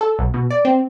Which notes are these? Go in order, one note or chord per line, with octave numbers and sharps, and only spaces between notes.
A4
B1
B2
D5
C4